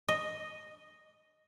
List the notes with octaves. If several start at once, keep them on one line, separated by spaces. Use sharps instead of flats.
D#5